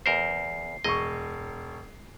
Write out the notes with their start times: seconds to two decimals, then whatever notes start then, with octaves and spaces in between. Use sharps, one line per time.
0.06 E2 A#4 C5 C7
0.84 E1 D#5 C#6